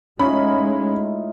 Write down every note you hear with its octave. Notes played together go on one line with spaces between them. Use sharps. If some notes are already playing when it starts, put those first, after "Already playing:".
A2 G#3 C#4 D#4 F4 B5